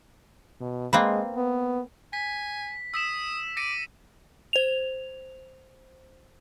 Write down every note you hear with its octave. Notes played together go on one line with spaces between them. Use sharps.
B2
G#3 A#3 C4 B4
B3
G#5 B6
D#6 E6 B6 E7
D6 A#6 C#7 D#7
C5 F7